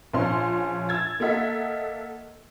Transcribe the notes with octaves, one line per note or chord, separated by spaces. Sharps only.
A#1 F3 C#4 C6
E6 G#6 A6
A#3 A4 D#5 E5 F#5